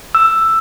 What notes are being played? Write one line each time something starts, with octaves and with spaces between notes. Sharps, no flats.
E6